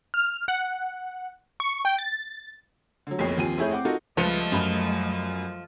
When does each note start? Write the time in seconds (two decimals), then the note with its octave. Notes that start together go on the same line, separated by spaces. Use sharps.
0.14 F6
0.48 F#5
1.60 C#6
1.85 G5
1.99 A6
3.07 D3 F#3
3.19 F#1 B1 F2 C#5 C7
3.38 D#2 F3 C4 G#5 D#7
3.58 F1 A3 E4 G#4 C#5 G6
3.71 C4 F#5 D6
3.85 D#4 F4 F#4 A4 A#4 D#5
4.17 C#2 F3 G3 A3 B4 D#5 C#7
4.52 F#2 B5 F6